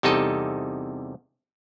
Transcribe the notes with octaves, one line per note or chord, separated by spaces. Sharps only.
E2 C3 G3 D#4 A4 D#5